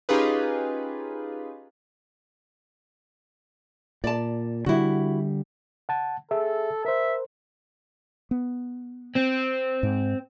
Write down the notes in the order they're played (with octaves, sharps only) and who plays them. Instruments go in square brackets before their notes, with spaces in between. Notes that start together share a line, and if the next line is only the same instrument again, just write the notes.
[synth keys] C#4 D#4 F4 G4 G#4 B4
[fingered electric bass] A#2 [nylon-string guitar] D5 A5
[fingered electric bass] D3 G3 [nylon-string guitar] E4 F#4
[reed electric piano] F#5 A5
[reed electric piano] G#4 E5 [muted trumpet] A4
[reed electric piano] A#4 C5 [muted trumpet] E5
[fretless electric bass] B3
[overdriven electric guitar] C4
[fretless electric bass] G#2